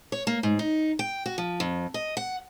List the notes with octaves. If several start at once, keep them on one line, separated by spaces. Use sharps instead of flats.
C#5
A#3
G#2
D#4
G5
F#4
F3
F2
D#5
F#5